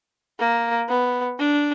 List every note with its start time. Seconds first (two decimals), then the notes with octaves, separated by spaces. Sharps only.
0.40 A#3
0.89 B3
1.39 D4